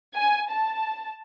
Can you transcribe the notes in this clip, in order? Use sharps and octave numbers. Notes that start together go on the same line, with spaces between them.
G#5
A5